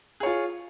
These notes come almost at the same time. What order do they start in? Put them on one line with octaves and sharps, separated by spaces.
G#4 C#5 F4